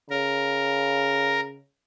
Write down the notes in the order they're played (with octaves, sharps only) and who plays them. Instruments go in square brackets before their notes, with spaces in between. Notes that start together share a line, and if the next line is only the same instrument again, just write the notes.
[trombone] C#3 [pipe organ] A#4